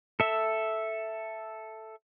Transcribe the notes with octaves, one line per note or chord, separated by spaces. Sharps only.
A4 E5